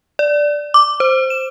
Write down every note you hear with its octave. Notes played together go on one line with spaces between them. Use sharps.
D5
D6
C5
E7